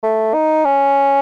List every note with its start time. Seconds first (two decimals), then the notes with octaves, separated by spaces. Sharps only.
0.03 A3
0.34 D#4
0.65 C#4